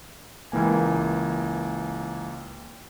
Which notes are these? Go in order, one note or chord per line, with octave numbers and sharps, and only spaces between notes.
C#2 E3 A#3 G#5